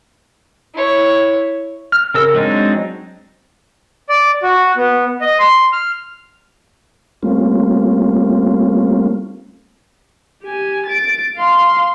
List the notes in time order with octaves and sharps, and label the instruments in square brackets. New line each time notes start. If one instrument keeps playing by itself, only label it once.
[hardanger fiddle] E4 C#5
[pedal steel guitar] F6
C#3 A#4 E6
F#3 G#3 C4 D4 D#4
[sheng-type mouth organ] D5
F#4
B3
D#5
C6
F6
[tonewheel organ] G3 A3 A#3 C4 C#4 F4
[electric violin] G4 G#5
A6 D7
F5 C6